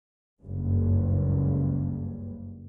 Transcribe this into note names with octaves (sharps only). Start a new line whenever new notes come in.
F#1 C#2 G2